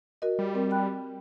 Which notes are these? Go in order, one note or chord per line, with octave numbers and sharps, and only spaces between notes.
F#4 A#4 D#5
G3
C4 A#4
G5 B5 F#6